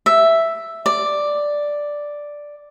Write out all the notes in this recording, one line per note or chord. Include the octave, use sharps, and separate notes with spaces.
E5
D5